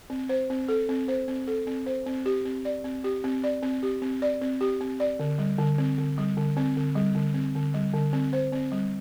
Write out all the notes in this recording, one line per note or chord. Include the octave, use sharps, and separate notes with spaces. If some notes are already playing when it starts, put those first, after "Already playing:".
C4
C5
C4
A4
C4
C5
C4
A4
C4
C5
C4
G4
C4
D5
C4
G4
C4
D5
C4
G4
C4
D5
C4
G4
C4
D5
D3
G3
D3
C4
D3
G3
D3
C4
D3
G3
D3
C4
D3
G3
D3
C4
C5
C4
G3